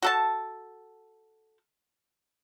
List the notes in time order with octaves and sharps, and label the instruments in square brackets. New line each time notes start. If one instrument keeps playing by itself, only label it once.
[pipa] F#4 A4 A5